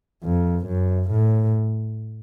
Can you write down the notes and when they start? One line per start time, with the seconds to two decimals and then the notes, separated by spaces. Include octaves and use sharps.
0.24 F2
0.67 F#2
1.11 A2